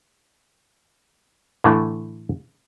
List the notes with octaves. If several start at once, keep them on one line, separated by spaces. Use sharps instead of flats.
A2 D3 E3 A3